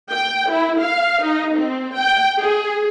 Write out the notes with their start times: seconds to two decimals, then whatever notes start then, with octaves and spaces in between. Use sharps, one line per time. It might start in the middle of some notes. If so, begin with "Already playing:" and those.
0.11 G5
0.50 E4
0.80 F5
1.24 D#4
1.56 C4
1.96 G5
2.40 G#4